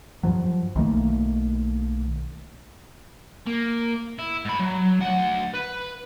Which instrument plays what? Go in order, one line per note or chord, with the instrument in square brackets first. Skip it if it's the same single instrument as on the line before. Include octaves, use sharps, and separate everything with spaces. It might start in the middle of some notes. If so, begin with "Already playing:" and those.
[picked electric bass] G2 F3 F#3
B1 D#3 A3 A#3
[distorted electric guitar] A#3
E4
G#2 B5
F#3
D2 F#5
B4